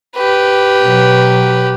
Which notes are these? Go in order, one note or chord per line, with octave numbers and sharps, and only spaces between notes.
G4 B4
B2 F#3